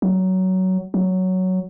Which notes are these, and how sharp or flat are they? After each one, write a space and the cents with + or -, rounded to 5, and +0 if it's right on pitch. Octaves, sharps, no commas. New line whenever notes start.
F#3 +15
F#3 +5